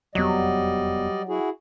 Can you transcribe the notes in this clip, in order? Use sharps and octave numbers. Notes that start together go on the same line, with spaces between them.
E1 F2 F#3 G3 B3 D5 D#5
E4 F#4 G#4